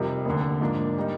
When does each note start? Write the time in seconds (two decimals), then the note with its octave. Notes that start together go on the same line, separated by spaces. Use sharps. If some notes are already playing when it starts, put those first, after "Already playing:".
Already playing: F2 C3 D#3 G3
0.25 F1 D#2 D3
0.61 G#2 F3 A#3 D4
0.98 G3 A#3 D#4